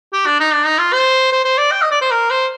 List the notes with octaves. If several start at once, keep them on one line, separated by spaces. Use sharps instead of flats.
G4
D4
D#4
D4
D#4
F4
C5
C5
C5
D5
G5
D#5
D5
C5
A#4
C5